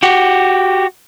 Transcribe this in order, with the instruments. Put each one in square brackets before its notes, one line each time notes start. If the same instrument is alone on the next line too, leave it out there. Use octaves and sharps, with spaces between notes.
[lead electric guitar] F#4 G4